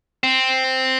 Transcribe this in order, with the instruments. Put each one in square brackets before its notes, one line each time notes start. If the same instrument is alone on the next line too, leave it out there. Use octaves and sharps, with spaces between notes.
[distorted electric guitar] C4